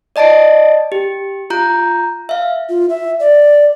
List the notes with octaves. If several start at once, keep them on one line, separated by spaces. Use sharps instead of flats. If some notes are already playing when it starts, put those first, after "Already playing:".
D5 D#5 A5 A6 D7
G4
F4 A#5 G6
E5 F5
F4
E5
D5